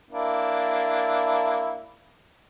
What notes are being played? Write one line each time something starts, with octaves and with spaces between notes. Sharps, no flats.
A#3 D4 E4